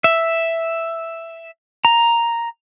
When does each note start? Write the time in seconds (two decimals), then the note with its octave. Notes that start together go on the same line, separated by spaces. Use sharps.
0.04 E5
1.85 A#5